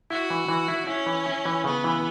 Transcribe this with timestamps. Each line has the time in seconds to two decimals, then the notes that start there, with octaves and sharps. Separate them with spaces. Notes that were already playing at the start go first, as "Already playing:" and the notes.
0.10 E4 F#4
0.30 E3
0.48 E3
0.68 E4
0.87 C#4 E4
1.06 E3
1.26 E4
1.45 E3
1.64 C#3 B3
1.84 E3